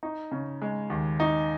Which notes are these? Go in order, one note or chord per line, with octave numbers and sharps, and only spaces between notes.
D#4
C#3
G#3
D#2
D#4